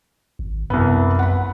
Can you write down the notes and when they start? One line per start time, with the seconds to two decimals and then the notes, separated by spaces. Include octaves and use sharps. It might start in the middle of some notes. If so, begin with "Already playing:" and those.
0.39 G#1
0.70 C2 F#2 B3
1.19 F#5 B5